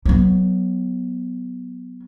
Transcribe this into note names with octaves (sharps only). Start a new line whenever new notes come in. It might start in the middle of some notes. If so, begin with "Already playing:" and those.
F#3 B3